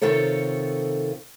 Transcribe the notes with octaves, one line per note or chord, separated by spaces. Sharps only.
C3 D#3 F4 A4 C#5